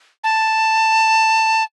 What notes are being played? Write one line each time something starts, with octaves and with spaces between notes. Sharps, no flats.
A5